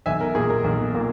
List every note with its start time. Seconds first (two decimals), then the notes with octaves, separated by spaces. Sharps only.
0.06 B1 E5 G#5
0.21 A#4
0.35 A#2 A#3 G#4
0.50 A#4
0.64 B1
0.94 A#2 A#3